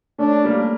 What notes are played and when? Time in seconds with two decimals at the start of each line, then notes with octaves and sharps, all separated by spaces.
0.18 A3 C#4 D4
0.44 G3 A#3